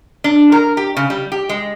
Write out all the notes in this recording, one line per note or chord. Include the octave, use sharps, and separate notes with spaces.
D4
A#4
G4
C#3
G3
G4
G#3